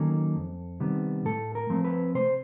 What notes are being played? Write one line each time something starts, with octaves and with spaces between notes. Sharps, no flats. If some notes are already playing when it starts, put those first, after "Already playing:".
Already playing: D#3 F#3 A#3 C#4 A4
F2
C3 D#3 G3 B3
A2 A4
A#4
F3 A3 C4
B4
C3 C5